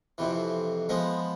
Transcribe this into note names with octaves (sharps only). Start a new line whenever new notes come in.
F2 C3 E3
F3 G#3 B3